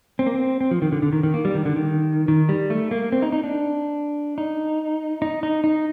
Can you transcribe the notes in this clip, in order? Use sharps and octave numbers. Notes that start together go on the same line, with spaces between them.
C4
A#3
C4
C4
F3
D#3
D3
D3
D#3
D#3
A#3
G3
D#3
D3
D#3
D#3
G3
A3
A#3
C4
D#4
D#4
D4
D#4
D#4
D#4
D#4